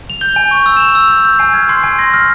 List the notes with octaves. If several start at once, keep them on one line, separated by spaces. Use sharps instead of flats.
F7
G6 G7
G#5
C#6
E6
E7
C#6 F7
E6
G6
G6
G#5 C7
F6 G#6
C6 C7
G#5 G#6
C6 A#6
F6